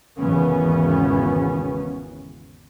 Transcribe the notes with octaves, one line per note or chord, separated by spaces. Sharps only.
G#1 E2 C#3 E3 B3 C#4